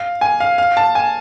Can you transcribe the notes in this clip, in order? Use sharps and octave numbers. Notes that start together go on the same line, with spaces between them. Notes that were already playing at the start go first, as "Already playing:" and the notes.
Already playing: F5
G#5
F5
F5
A5
G#5